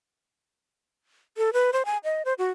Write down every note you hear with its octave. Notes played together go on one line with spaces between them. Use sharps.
A4
B4
C5
G#5
D#5
C5
F#4